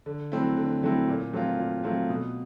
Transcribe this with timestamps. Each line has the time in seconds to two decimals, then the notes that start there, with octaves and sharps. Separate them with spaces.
0.06 D3
0.32 F#3 A3 C4 E4
0.57 D3
0.83 F#3 A3 C4 E4
1.08 A#2
1.33 F#3 A3 C4 F4
1.59 A#2
1.84 F#3 A3 C4 F4
2.09 B2